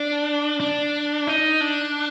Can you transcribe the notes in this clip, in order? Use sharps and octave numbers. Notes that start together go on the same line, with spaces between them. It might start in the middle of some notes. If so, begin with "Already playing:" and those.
Already playing: D4
D4
D#4
D4